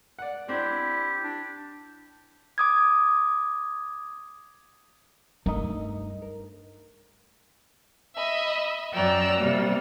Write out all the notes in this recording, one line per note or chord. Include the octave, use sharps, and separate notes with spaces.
D5 F#5
C4 D4 E4 G4
D4
D6 D#6 G#6
G2 A3 D#4 A#4 D#5
A#4
D#5 E5 B5
F#2 D5 G5 A#5 E6 F#6
C3 G3 A#3